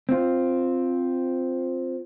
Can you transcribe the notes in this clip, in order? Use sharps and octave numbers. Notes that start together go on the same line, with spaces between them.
C4 F4